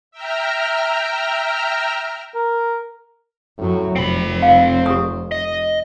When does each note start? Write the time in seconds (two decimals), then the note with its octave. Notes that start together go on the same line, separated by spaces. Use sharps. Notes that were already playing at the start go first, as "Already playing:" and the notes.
0.11 E5 G5 A#5 F6
2.35 A#4
3.58 F#2 A2 F#3
3.96 F1 C4 C5 B5
4.42 F5
4.86 G4 D#6
5.32 D#5